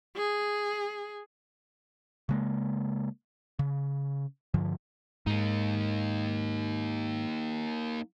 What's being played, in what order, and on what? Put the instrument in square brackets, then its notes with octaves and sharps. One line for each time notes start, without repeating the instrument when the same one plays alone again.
[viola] G#4
[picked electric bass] C#3 G#3 A#3
C#3
G2 D3 F3
[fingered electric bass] G#2 [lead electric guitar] A#3 D#4